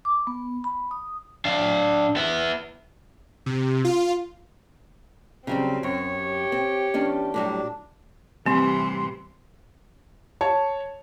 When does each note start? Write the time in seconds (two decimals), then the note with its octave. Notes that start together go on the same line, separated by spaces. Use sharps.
0.05 D6
0.27 B3
0.64 B5
0.91 D#6
1.45 D4 F5
2.16 B3 E4
3.46 C3
3.85 F4
5.47 C#3 F#3 G3 C4
5.83 F#2 C#5
6.15 G4
6.52 C4
6.94 E2 C#4 D4
7.34 A2 F#3 G3 D4
8.46 A2 C3 E3 G3 C4 C6
10.41 C#5 A5